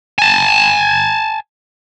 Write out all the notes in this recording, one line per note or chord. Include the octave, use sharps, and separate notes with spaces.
G#5 A5